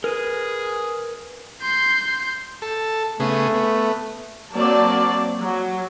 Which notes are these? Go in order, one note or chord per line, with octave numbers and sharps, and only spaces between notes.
G#4 A#4 B4
C6 G6
A4
C#3 A3 B3 G#4
B3
F#3 A#3 C4 D5 A5
F#3